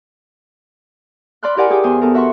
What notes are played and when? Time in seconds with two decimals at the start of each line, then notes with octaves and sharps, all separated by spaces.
1.43 D5 B5 C6 F6 F#6
1.56 E4 G4 A#4 D5 F#5 G#5
1.70 G4 G#4 G5 D6 D#6
1.83 E2 C5 G#5 D#6
2.01 B3 A4 A#4
2.14 F#4 E5 F#5 C6 C#6